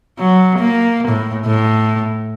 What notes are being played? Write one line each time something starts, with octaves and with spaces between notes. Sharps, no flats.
F#3
A#3
A2
A2